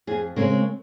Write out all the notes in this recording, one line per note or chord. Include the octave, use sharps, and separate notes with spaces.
F2 G#4
C#3 G#3 C4 A#4